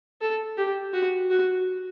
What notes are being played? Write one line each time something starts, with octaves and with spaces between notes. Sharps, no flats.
A4
G4
F#4
F#4